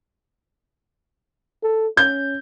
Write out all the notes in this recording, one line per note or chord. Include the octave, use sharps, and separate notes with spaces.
A4
C#4 G6